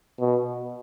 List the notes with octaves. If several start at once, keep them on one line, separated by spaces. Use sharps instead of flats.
B2